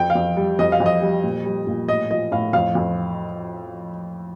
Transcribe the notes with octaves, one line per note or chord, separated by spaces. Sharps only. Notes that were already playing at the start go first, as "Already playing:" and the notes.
Already playing: F2 G5
F5
F2
G3
F2 D#5
F5
F2
D#5
G3
A#2
G3
A#2
A2 D#5
F3 D#5
A2 F5
F2 F5
F2